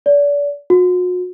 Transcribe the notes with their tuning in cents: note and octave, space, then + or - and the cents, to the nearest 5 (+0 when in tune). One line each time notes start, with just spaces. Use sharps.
D5 -35
F#4 -40